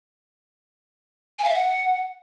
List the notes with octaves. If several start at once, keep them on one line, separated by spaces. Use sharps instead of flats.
G#5
F5
E5
F#5